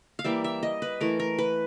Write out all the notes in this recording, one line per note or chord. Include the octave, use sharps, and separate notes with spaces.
F5
E3 G3 A#3 E5
E5
D#5
B4
E3 A3 A#4
A#4
B4